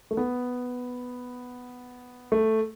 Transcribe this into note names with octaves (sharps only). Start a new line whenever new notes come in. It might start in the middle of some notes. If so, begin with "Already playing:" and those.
A3
B3
A3